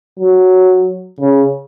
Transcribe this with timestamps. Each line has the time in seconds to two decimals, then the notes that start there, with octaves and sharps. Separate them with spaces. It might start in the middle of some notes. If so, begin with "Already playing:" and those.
0.19 F#3
1.20 C#3